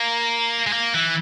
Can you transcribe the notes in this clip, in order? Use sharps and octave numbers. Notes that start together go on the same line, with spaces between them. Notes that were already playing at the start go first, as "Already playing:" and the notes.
Already playing: A#3
G#3
A#3
E3